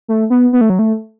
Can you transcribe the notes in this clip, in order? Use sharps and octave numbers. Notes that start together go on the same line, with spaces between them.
A3
B3
B3
A3
F#3
A3